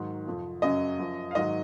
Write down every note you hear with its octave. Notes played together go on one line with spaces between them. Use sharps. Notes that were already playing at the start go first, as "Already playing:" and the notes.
Already playing: G#2 D#3 F#3
F2 C3 F3
F#2 C#3 F#3 D#5
F#2 F3
F5
G#2 D#3 F#3 D#5